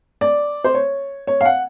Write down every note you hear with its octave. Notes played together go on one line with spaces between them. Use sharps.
D5
C5
C#5
C#5
F5
F#5